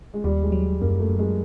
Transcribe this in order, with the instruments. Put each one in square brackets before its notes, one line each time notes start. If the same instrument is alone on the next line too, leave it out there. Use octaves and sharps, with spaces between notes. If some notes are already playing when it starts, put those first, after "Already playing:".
[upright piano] G#3
[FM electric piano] D#2 [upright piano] G3
[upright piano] G#3
[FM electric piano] F#3
[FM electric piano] F#2 [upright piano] A#3
[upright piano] A3
[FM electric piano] F#2
[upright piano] G#3